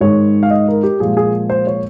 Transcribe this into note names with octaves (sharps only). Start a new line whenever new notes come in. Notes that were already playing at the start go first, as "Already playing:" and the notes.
G#2 D#3 G#3 C#5
F5
D#5
A#4
G4
A#2 F3 G#3 G#4
G#4
C5
C#5